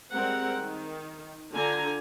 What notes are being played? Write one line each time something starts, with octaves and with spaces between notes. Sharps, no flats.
G3 G#3 C4 A#4 F#5
D#3
D3 F4 G#5 A#5